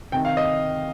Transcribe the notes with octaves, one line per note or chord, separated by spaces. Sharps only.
C3 D#3 G5
F5
D#5